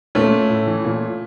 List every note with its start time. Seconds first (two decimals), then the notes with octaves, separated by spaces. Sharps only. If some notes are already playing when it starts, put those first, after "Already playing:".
0.15 A#2 A3 C#4
0.50 A2
0.67 E3
0.85 A#2